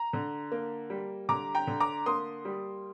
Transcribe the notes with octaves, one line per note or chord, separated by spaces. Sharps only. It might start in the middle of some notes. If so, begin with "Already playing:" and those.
Already playing: A#5
D3
A#3
G3
D3 A#5 D6
G5 A#5
D3
A#5 D6
A#3 C6 D#6
G3